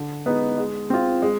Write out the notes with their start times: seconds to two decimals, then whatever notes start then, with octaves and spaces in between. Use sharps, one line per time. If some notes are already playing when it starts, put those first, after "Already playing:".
Already playing: D3
0.26 G#3 B3 D#4 B4
0.58 G#3
0.90 C4 F4
1.22 G#3